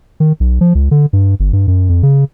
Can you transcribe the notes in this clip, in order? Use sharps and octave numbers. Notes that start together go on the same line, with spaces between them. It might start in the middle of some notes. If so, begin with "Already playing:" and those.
D#3
B1
F3
C#2
D3
G2
G1
G2
F#2
F2
C#3